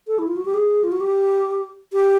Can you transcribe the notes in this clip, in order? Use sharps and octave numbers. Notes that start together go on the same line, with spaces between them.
A4
E4
F4
F#4
G4
G#4
F4
F#4
G4
G4